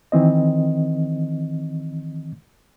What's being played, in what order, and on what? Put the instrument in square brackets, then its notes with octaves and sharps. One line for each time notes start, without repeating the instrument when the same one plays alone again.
[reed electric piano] D#3 E3 C4 D#5